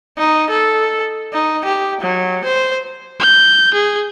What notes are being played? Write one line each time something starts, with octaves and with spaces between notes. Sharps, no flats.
D#4
A4
D#4
G4
F#3
C5
G6
G#4